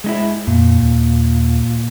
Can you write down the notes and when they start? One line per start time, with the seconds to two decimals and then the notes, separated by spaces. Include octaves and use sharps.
0.04 G#3 D#4 E4
0.47 F2 A#2
0.78 D#2